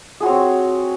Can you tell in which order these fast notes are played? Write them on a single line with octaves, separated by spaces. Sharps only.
G#4 F#4 C#5 C4